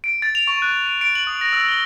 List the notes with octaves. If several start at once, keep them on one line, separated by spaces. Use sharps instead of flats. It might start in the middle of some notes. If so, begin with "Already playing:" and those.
D7
A6
F7
C#6
F#6
D7
D7
F#7
D#6
A#6
E6
G7